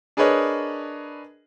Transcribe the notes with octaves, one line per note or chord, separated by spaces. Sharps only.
D4 G#4 A#4 B4 C#5 D#5